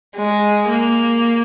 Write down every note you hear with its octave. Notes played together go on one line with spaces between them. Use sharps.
G#3
A#3